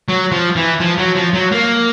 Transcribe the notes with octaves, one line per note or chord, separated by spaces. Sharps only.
F#3
F3
E3
F3
F#3
F3
F#3
A#3